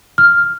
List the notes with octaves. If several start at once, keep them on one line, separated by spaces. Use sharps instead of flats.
F6